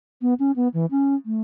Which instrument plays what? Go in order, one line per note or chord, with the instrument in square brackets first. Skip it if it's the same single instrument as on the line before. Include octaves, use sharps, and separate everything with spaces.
[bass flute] B3
C#4
B3
E3
C#4
A3